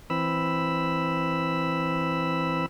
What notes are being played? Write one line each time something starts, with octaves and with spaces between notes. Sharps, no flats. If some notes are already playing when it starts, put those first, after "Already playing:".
E3 C4 B5 E6